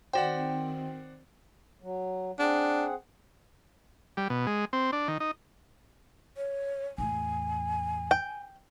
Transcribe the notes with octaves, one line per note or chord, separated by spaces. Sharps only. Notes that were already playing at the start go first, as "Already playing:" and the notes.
D#3 C4 F#4 C5 D5 F#5 G5
F#3
C4 D4 G#4 F#5
G3
B2
G#3
C4
D4
D#3
D#4
C#5
E2 A2 G#5
G5